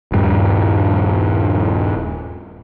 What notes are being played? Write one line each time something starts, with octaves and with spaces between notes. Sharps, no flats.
D#1 G2